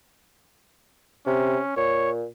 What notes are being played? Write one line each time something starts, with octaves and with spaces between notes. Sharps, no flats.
C3 C#4
A#2 C#5